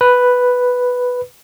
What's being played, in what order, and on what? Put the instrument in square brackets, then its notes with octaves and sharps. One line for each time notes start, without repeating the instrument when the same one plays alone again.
[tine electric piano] B4